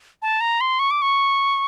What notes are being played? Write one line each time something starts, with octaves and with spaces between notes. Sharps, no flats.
A5
A#5
C6
C#6
D6
C#6